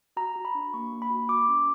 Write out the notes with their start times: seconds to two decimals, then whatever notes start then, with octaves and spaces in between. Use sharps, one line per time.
0.17 F#4 A#5
0.36 F#4
0.45 B5
0.55 D4
0.74 A#3 C#6
0.92 A#3
1.02 B5
1.10 F#4
1.29 F#4 D6
1.49 C#4